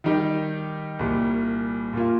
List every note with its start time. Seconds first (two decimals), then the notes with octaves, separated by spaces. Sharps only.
0.04 D#3 G3 D#4 G4
0.99 C2 A#2 G3
1.93 A#2 A#3 F4